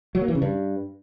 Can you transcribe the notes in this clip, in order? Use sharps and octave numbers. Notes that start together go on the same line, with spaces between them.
F#3
A#3
E3
C#3
G2